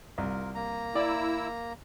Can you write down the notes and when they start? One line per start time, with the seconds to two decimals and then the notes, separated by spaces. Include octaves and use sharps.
0.18 C2 F4 A#4
0.55 A#3 A#5
0.95 E4 D5 E6